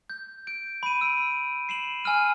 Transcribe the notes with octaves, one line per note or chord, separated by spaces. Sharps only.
G6
G6 D7
B5 D#7
E6 D7
C7 E7 F#7
G#5 E6 F6 D#7